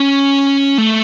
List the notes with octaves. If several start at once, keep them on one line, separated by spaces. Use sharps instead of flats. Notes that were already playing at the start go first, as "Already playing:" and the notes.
Already playing: C#4
A3